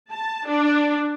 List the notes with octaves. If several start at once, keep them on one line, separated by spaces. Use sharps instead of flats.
A5
D4